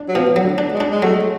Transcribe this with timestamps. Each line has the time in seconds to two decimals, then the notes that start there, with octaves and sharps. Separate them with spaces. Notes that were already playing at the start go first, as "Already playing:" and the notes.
Already playing: D4
0.09 F#3
0.15 B2 F3
0.36 F#3
0.44 D3
0.58 D4
0.73 G#3
0.80 D4
0.91 G#3
1.02 F#3 A3